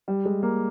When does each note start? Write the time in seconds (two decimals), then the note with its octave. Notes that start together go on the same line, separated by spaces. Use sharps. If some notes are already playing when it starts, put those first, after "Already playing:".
0.08 G3
0.25 G#3
0.43 A#3